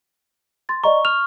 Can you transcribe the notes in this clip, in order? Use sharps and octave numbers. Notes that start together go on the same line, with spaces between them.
C6 A6
D5 D#5 A#5 C#6
F6 F7